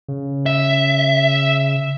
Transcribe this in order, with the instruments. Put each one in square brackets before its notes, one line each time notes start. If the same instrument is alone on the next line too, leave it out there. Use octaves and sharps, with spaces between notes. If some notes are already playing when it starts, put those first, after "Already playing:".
[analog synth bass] C#3
[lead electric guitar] E5